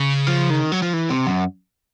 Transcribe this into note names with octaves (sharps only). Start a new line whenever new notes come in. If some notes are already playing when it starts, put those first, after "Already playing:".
Already playing: C#3
F3
D#3
F#3
F3
E3
C3
F#2